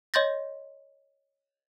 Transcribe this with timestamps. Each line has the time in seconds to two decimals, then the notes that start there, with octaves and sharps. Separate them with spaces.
0.14 C#5 D#5 C6 G6 A6 A#6